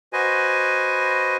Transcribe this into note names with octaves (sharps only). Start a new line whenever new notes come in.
F#4 B4 C5 D#5 G#5